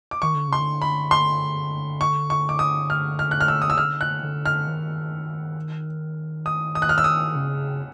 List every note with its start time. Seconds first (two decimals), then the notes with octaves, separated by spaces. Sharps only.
0.11 D6
0.22 D#3 C#6
0.35 D3
0.48 C#3 C6
0.60 D3
0.82 B5
1.11 C6
2.01 C#6
2.30 C#6
2.49 D6
2.59 D#6
2.90 F6
3.19 F6
3.31 F#6
3.41 F6
3.48 E6
3.62 D#6
3.70 E6
3.78 D3 F6
4.01 F#6
4.23 D3
4.46 F6
4.67 D#3
6.46 D#6
6.75 D#6
6.82 F#6
6.89 F6
6.98 E6
7.04 D#6
7.35 C#3